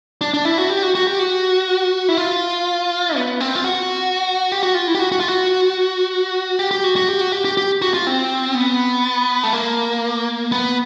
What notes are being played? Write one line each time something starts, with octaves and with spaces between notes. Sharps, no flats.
D4
D4
E4
F#4
G4
F#4
F#4
G4
F#4
E4
F4
B3
C4
F4
F#4
G4
F#4
F4
E4
G4
F#4
F#4
F4
F#4
G4
G4
F#4
F#4
G4
F#4
G4
G4
G4
F#4
F4
C4
B3
A3
A#3
B3